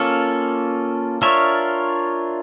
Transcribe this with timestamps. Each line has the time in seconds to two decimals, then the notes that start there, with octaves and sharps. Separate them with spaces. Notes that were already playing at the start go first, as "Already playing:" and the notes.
Already playing: A#3 C#4 F4 A4
1.22 D4 F4 A#4 C#5 E5